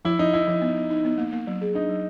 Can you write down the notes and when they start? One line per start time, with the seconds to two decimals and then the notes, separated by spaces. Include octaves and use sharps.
0.05 F3 E4
0.19 F3 D#4
0.33 D#4 E4
0.47 F3
0.62 B3
0.76 B3
0.90 D#4
1.05 B3
1.18 A#3
1.32 A#3
1.47 F#3
1.61 G#4
1.74 D4 D#4
1.89 F#3